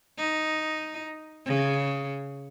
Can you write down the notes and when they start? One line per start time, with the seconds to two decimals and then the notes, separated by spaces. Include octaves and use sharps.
0.18 D#4
1.46 C#3